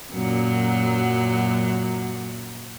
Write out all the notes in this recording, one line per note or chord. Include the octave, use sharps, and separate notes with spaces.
F#2 A#2 F#3